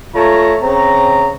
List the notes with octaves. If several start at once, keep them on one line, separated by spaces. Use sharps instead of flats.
A3 F4 C#5 A#5
C#3 C4 A#5